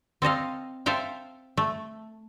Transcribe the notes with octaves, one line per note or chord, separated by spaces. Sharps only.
C4 A4 D#5 F5
A4 C5 E5 F5 G5
A3